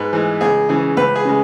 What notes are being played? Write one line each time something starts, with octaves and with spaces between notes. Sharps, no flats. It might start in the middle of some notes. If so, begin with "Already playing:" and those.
Already playing: G#2 B4
E3 G#3
C#2 G#4
C#3 E3 G#4
C#2 B4
G#4
C#3 G#3